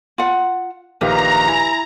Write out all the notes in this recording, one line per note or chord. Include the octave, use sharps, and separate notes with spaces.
F4 F#5
A#1 D#3 G4 B4 F5 A#5
E4 G#5